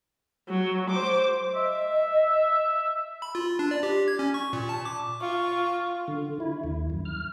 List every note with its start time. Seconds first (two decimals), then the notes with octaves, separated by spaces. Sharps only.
0.49 F#3
0.90 C5 D6
1.55 D#5 E5
3.22 B5
3.35 F4
3.59 D4
3.71 D5
3.83 G4
4.08 G#6
4.19 C#4
4.34 C#6
4.53 A#2
4.69 A5
4.85 D6
5.21 F4 C#6
6.08 D3
6.40 E4
6.64 D#2
6.90 F#2
7.05 F6